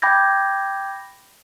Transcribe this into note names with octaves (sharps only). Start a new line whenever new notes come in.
G5 B5 D6 G6 G#6 A#6